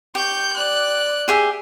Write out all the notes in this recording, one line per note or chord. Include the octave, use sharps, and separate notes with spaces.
G4 C#6 G6
D5 F#6
G4 G#4 E5